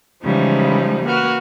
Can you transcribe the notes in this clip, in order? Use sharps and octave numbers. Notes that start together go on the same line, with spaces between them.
C#3 E3 F3 G3 G#3 D#4
A#3 F#4 B4 F6